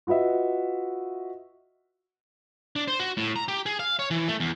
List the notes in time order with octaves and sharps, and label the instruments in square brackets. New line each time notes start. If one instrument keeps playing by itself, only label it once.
[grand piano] F4 F#4 B4 D#5 E5
[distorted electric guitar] D4
C5
F#4
A2
A#5
G4
G#4
F5
C#5
E3
A3
E2